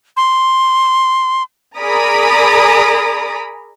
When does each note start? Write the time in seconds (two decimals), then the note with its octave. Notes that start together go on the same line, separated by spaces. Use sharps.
0.17 C6
1.79 G#4 A#4 D5 A#5 B5 D#6